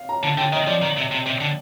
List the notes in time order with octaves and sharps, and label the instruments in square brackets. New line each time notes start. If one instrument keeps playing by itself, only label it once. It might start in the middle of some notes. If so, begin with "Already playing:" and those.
Already playing: [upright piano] F5
A#5
[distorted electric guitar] D3 [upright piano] A5
[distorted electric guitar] D3 [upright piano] G5
[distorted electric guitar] D#3 [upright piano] D#5
[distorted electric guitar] F3 [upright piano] D5
[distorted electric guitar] D#3
C3
C3
C3
D3